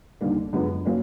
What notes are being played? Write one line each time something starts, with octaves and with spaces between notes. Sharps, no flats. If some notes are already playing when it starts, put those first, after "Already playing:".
D#2 D3 G3 A#3
F#2 D3 F3 G#3 B3
F#3 A#3 C#4